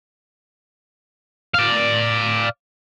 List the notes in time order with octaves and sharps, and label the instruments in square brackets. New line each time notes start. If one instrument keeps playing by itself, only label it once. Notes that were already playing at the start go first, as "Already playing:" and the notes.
[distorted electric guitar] D5 F5